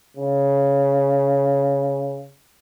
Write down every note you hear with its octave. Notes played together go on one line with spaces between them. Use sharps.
C#3